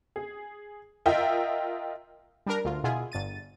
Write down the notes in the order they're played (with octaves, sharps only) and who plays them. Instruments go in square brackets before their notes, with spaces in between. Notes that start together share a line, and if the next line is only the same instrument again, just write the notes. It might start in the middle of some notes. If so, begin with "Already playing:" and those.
[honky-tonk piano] G#4
F4 A#4 D#5 E5 G5
[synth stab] G3 D4 A#4
D2 F4
B2 E4 F4 G#4
G1 A6 D#7